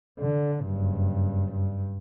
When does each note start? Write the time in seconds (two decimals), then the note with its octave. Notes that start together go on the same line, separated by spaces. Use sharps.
0.20 D3
0.64 F#1 G2
1.52 G2